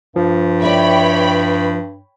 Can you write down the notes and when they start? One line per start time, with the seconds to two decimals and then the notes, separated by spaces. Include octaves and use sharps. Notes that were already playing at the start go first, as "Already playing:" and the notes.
0.16 G2 F3
0.62 E4 B4 C#5 D5 G5 B5